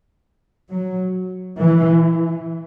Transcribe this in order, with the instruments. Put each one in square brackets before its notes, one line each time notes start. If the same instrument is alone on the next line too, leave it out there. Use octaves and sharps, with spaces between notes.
[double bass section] F#3
E3